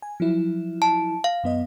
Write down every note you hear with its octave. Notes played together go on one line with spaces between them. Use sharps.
G#5
F3 F#3 E4
A5
F5
F#2 B3 D#5